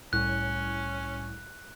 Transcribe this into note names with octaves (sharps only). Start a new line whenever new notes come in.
C2 A2 C#4 F#6